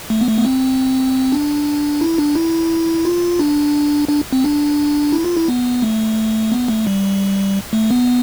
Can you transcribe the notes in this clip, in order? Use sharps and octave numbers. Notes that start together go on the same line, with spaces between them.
A3
B3
A3
B3
C4
D4
E4
D4
E4
F4
D4
D4
C4
D4
E4
F4
E4
B3
A3
B3
A3
G3
A3
B3